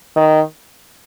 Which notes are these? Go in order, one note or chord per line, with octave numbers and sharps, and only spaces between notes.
D#3